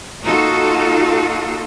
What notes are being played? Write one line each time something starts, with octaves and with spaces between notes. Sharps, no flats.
A#3 D#4 F4 F#4 A4